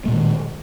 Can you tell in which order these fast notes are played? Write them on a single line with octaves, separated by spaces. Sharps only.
A3 A#2 G#3 D#3